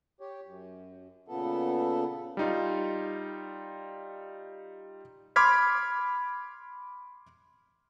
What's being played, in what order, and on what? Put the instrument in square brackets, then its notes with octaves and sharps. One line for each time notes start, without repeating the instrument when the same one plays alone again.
[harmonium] G4 C#5
F#2
A#2 C#3 B3 A4
[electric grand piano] G3 D#4 F4
B5 C6 D6 F6 G#6 B6